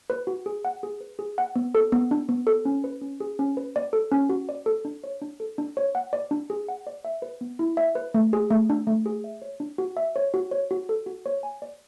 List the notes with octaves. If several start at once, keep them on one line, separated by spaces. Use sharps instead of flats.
B4
F#4
G#4
F#5
G#4
B4
G#4
F#5
B3
A4
B3
D4
B3
A4
C#4
B4
C#4
G#4
C#4
B4
D5
A4
C#4
F#4
D5
A4
D4
C#5
D4
A4
D4
C#5
F#5
D5
D4
G#4
F#5
D5
E5
B4
B3
E4
E5
B4
A3
G#4
A3
D4
A3
G#4
E5
C#5
D4
F#4
E5
C#5
F#4
C#5
F#4
A4
F#4
C#5
G#5
D5